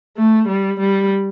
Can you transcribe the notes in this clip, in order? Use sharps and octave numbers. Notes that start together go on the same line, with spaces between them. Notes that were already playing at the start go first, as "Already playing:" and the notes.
A3
G3
G3